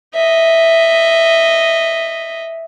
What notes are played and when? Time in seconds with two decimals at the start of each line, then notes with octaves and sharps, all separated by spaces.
0.14 D#5 E5